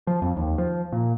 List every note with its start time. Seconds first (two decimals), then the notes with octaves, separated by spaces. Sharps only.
0.07 F3
0.22 F2
0.37 D#2
0.58 F3
0.92 A#2